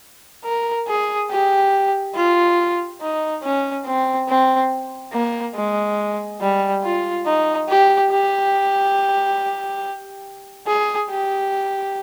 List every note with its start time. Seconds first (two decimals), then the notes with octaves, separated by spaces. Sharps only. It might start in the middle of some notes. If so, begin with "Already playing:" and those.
0.45 A#4
0.88 G#4
1.30 G4
2.15 F4
3.01 D#4
3.43 C#4
3.86 C4
4.29 C4
5.13 A#3
5.56 G#3
6.41 G3
6.84 F4
7.26 D#4
7.69 G4
8.11 G4
10.67 G#4
11.09 G4